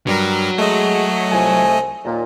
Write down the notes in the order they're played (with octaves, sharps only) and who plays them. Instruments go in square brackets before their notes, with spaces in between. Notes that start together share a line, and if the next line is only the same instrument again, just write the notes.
[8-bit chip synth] G2 G3 A#4 [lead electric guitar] F#3
[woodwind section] G#3 [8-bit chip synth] A3 D#5
[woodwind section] C2 F3 G#5
D#2 A#2